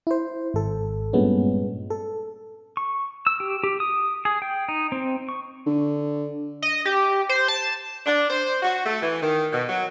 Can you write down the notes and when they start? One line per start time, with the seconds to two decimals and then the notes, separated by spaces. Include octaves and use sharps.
0.07 E4 C5
0.54 G#1 A4
1.13 G2 A#2 G#3 B3 C#4
1.90 A4
2.77 C#6
3.27 E6
3.40 G4
3.64 G4
3.80 D#6
4.25 G#4
4.42 G5
4.69 D#4
4.92 C4
5.29 C#6
5.66 D3
6.62 D#5
6.85 G4
7.29 C5
7.48 A5
8.06 D4
8.30 C5
8.62 F#4
8.85 A3
9.02 E3
9.23 D#3
9.53 B2
9.69 F#3